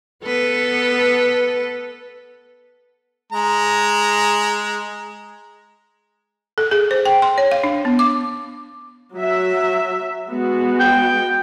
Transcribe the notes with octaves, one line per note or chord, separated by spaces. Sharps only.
B3 A4 B4
G#3 A#5
A4
G#4
C5
G5
C6
C#5
F5
D4
B3
D6
F#3 E5
G#3 B3 F#4
G5